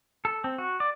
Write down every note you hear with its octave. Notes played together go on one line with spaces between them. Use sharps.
A4
C4
F#4
D5